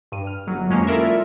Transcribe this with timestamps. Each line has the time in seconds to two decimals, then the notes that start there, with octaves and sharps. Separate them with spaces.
0.12 G2 D#7
0.27 F6
0.46 G1 F#3
0.70 F2 G#3 A#3 C#4
0.87 E4 F4 A4 A#4 D5 E5